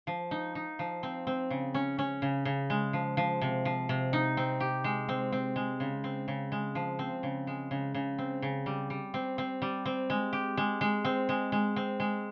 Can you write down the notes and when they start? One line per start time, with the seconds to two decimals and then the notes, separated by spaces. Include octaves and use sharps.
0.07 F3
0.31 D#4
0.55 D#4
0.79 F3
1.03 C4
1.27 C4
1.50 C#3
1.74 C#4
1.99 C#4
2.22 C#3
2.45 C#3
2.70 G#3
2.93 F3
3.17 F3
3.41 C3
3.65 F3
3.89 C3
4.13 D#4
4.37 C4
4.60 G4
4.84 G#3
5.09 C4
5.32 C4
5.56 G#3
5.80 C#3
6.04 C4
6.28 C#3
6.52 G#3
6.75 F3
6.99 C4
7.23 C#3
7.47 G#3
7.71 C#3
7.94 C#3
8.18 C4
8.42 C#3
8.66 G3
8.90 G3
9.14 C4
9.38 C4
9.62 G3
9.86 C4
10.10 G#3
10.33 G4
10.57 G#3
10.81 G#3
11.05 C4
11.29 G#3
11.52 G#3
11.76 C4
12.00 G#3